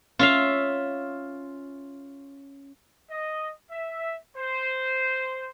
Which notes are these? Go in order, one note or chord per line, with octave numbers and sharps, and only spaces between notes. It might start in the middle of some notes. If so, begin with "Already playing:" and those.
C#4 F4 E5 F5
D#5
E5
C5